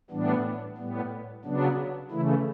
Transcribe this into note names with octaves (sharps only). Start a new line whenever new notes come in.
A2 E3 G3 B3 D4
A2 G3 B3
C#3 F#3 B3 D4
C#3 E3 A3 E4